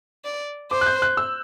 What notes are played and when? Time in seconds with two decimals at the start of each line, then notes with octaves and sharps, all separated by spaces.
0.25 D5
0.71 C5 D6
0.81 F#6
0.86 G6
1.02 F#6
1.17 E6